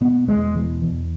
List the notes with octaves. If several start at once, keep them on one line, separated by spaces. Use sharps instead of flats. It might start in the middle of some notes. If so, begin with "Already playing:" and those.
B2 B3
E2 G#3
B2 E3
E2